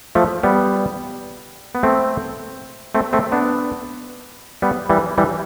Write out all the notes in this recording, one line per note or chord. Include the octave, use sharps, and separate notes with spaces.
F3 A3
G3 B3
B3
A3 C4
A3 C4
A3 C4
B3 D4
G3 B3
E3 G3
E3 G3